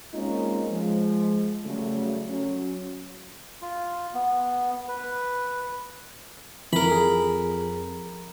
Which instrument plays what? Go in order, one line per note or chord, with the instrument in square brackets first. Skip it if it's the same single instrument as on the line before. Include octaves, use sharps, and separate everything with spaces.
[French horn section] G#3 A#3 C4 C#4 D#4 F4
F3 G#3
C#3 F#3 G3 A3
F#3 C#4
[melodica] F4
B3
B4
[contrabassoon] F2 [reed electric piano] E3 [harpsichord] A#4 B5
[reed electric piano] G#4